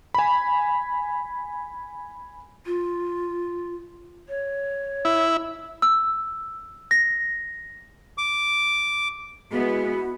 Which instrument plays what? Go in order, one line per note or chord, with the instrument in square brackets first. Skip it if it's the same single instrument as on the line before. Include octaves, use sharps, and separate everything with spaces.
[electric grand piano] G#5 B5
[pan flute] F4
C#5
[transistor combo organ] E4
[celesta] E6
A#6
[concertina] D6
[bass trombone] G#3 [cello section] B3 E4 [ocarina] F#4